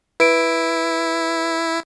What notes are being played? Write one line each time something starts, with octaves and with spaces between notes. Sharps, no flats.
E4 B4 D7